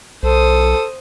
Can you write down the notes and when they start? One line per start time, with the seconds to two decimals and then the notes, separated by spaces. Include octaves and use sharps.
0.23 B1 A4 C5 D#6